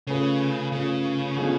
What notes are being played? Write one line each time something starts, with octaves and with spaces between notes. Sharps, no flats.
C#3 A3 C#4 F4 G#4 B4
C#3 A3 C#4 F4 G#4 B4
D3 F3 G#3 B3 F4